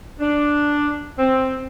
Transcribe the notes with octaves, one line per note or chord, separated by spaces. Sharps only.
D4
C4